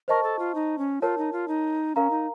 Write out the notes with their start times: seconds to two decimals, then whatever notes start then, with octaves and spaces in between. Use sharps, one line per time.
0.08 A#4 C5 D#5 A5 C#6
0.23 A4
0.39 F4
0.55 D#4
0.78 C#4
1.02 F4 A#4 C#5 A5
1.18 D#4
1.33 F4
1.48 D#4
1.95 C#4 A#4 F5 A#5
2.10 D#4